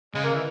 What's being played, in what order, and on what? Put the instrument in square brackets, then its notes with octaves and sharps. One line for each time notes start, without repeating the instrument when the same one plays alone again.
[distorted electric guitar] C#3 [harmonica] G#3
[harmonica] A#3
E3